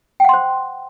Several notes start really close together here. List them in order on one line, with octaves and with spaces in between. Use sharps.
G5 F#5 C6 C5